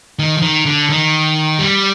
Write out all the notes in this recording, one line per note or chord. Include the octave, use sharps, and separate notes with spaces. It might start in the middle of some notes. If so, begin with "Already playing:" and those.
D#3
F3
D#3
D3
D#3
G3